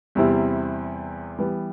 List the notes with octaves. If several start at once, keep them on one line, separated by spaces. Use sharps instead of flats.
E2 C3 G3 C4 E4
E3 G3 B3